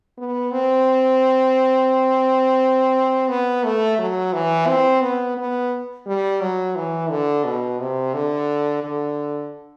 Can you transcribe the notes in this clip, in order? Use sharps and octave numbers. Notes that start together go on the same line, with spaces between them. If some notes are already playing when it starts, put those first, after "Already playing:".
B3
C4
B3
A3
F#3
E3
C4
B3
B3
G3
F#3
E3
D3
B2
C3
D3
D3